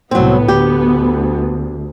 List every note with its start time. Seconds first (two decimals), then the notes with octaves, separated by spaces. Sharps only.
0.11 C2 A2 F#3 B3 C4
0.48 D2 G4